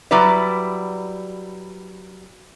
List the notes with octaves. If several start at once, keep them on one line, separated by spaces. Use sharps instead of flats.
F#3 G3 E4 B4 D5